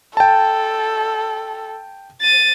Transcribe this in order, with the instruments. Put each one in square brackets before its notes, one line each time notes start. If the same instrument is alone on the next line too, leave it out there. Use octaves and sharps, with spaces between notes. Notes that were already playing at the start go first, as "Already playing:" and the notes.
[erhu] A4 [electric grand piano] G5 A5
[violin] A6 D#7